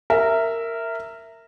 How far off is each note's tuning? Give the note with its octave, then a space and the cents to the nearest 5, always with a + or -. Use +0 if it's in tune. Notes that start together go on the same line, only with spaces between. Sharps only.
A#4 -15 E5 +0